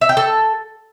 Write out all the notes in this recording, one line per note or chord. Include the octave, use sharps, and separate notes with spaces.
E5
G5
A4